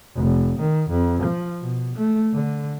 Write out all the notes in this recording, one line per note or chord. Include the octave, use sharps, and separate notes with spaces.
F1
D#3
F2
F3
B2
A3
D3